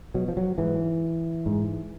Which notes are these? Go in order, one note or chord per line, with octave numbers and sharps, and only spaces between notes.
B2 F#3
F3
F#3
G#2 E3
G#2